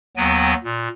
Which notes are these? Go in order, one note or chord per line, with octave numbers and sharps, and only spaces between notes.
D#2 F#3 B3 G5 G#5 A#6
A#2